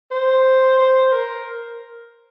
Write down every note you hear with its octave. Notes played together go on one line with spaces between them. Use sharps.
C5
C5
A#4